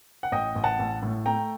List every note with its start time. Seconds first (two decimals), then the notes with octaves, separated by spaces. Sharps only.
0.23 F#5
0.32 A1 D#5 G5
0.55 A1
0.64 F#5 A5
0.79 A1
1.03 A2
1.26 A3 G5 A#5